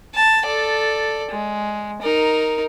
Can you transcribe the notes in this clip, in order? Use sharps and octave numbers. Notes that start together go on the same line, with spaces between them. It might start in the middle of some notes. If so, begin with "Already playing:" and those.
A5
A4 D5
G#3
D#4 A#4